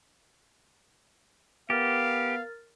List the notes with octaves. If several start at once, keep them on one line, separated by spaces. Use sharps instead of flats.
B3 G4 A#4 F5 F6 A6